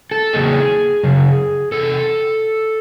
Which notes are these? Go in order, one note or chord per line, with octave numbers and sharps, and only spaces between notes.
A4
E2 C#3 F#3 A#3 G#4
F#2 C#3
E2 C3 A4